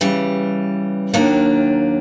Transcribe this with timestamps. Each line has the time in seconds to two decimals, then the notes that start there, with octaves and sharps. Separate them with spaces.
0.01 C#3 E3 G3
1.14 D#2 D#3 F#3 A#3 D4